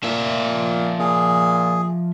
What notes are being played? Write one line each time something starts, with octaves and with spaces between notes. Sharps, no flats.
A#2 F3 E5
A#2 G#4